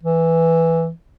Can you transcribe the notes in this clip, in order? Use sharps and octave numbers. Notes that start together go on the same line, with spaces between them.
E3